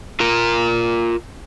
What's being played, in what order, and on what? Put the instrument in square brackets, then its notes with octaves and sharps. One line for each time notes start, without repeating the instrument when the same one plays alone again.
[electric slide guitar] F4 A#4 A#5